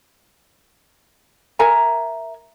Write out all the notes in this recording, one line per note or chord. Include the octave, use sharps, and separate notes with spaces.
A#4 E5 G#5 A#5